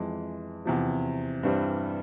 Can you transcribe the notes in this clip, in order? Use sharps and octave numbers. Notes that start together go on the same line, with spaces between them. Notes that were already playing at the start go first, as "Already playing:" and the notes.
Already playing: F2 E3 G#3
E2 C3 F3
G2 E3 G3 C4